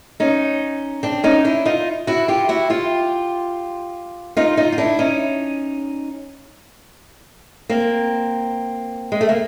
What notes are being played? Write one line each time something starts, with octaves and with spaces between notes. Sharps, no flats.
C#4 D#4
C4 D4
C#4 D#4
D4 E4
D#4 F4
E4 F#4
F4 G4
E4 F#4
F4 G4
D#4 F4
D#4 F4
F4
D4 E4
C#4 D#4
A#3 C4
G#3
A3
A#3